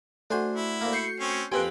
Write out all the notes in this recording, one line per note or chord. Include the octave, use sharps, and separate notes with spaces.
A3 D4 F#4 C5 G#5
E4
D2 A#3
C#6 G6 C7 C#7
C4 C#4
F2 A#3 C4 G4 B4 G#5 F#6